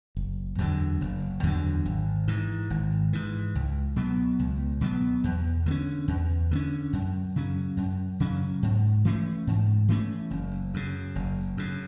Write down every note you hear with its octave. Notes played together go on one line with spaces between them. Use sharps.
F#1
E2 D3 F#3
F#1
E2 D3 F#3
G#1
G#2 E3
G#1
G#2 E3
C#2
B2 F#3 B3
C#2
B2 F#3 B3
E2
D3 A3 C#4
E2
D3 A3 C#4
F#2
C#3 F#3 C#4
F#2
C#3 F#3 C#4
G#2
E3 A3 C#4
G#2
E3 A3 C#4
F#1
F#2 C#3
F#1
F#2 C#3